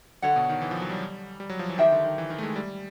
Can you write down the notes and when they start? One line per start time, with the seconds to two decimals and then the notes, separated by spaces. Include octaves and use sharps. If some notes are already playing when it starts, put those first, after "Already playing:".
0.22 D3 A4 C#5 F#5
0.36 B2
0.49 D#3
0.62 E3
0.71 F3
0.81 F#3
0.90 G3
1.40 G3
1.49 F#3
1.59 F3
1.69 E3
1.78 D#3 G4 C5 E5 G5
1.92 D3
2.04 D#3
2.18 E3
2.30 D#3
2.38 A3
2.43 G#3
2.56 G3